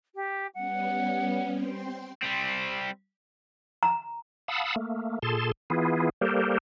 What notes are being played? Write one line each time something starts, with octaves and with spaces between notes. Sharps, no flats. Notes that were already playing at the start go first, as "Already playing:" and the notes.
G4
G3 B3 C#4 F#5
C4 G5 C6
G3 C4
A#5
F5 F#5 A5 B5 D#6 E6
A3 A#3
A#2 G#4 A4 A5 C6
E3 B3 E4 F4 G#4
G3 A#3 G4 A4 A#4 C5